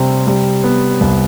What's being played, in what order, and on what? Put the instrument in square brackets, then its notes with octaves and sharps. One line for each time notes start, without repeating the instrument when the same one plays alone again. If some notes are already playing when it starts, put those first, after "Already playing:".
Already playing: [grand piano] C3 G3 C4
G3
B3
C2